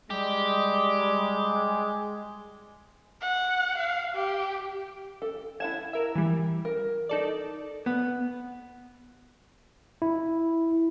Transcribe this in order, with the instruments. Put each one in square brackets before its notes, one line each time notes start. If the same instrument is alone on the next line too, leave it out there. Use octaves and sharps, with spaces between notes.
[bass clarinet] G3 [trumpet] G#3 [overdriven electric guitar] G4
[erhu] F#5
F5
G4
[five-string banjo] A4
[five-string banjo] E4 F#5 A5 [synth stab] G#6 E7
[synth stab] A#4 E5
E3 G3
[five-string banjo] A#4
[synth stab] D#4 A4 D5
[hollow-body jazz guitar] B3
[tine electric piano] E4